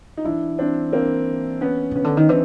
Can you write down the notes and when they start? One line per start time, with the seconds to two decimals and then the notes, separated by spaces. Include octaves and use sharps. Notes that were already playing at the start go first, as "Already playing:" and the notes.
0.17 D#4
0.24 E3 D4 E4
0.58 C4 D4
0.92 A#3 C4
1.61 B3 C#4
1.91 C#3 B3 C#4
2.04 D3
2.17 D#3 D#4
2.29 E3 C4 D4